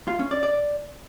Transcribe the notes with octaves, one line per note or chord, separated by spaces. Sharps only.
F4
C#4
D5
D5